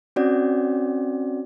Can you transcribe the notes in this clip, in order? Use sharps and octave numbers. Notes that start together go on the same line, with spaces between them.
C4 C#4 F#4 D5